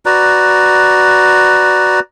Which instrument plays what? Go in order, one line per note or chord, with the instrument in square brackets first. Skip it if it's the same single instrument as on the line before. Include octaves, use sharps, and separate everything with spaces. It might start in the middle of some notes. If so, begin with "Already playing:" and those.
[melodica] F#4 B4 D5 A#5